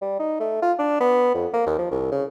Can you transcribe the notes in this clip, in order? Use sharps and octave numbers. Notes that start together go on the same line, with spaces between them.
G3
D#4
A3
F4
D4
B3
F2
A#3
D#2
F3
C2
C#3